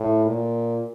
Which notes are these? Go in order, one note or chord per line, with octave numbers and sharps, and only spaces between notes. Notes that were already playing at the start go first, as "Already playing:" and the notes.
Already playing: A2
A#2